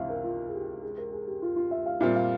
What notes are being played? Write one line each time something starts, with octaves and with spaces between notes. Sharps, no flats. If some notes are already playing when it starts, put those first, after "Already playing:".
Already playing: C#2 C3 E3 E5 F5
A#4
F4
G#4
G4
G#4
A#4
G#4
G4
F4
F4
E5
F5
A#2 G3 C4 F4 E5
F5